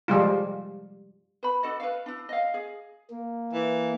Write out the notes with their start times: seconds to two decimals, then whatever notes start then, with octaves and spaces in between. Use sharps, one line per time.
0.08 F3 G3 G#3 F4
1.43 B4 B5
1.63 D4 F#4 A4 D#5
1.80 B4 F5
2.06 D4 E4
2.29 D#5 F5
2.54 G#4
3.10 A#3
3.53 E3